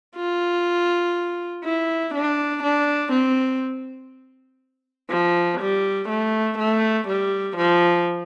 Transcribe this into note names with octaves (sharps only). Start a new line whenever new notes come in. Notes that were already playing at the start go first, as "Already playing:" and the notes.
F4
E4
D4
D4
C4
F3
G3
A3
A3
G3
F3